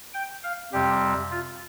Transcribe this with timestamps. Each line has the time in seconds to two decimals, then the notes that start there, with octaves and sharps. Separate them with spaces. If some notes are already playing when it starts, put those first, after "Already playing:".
0.14 G5
0.43 F5
0.73 F2 C3 G3 C4 G4
1.31 F4